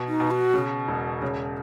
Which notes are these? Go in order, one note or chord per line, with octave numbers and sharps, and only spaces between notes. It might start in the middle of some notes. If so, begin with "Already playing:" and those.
Already playing: B2
D#4
B2
F#4
C#3
E1
C#3